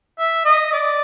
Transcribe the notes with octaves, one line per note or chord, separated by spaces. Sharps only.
E5
D#5
D5